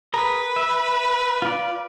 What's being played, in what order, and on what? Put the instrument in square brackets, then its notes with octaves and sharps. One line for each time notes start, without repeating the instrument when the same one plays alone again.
[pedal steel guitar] G#4 A#4 A#5 [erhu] B4
[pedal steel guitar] E5
F4 D5